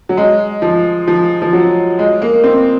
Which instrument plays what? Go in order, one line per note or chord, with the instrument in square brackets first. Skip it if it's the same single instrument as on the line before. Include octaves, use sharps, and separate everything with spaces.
[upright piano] F#3
G#3
F3
F3
F3
F#3
G#3
A#3
C4